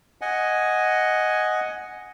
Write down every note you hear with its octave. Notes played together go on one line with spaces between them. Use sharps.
D#5 F#5 G#5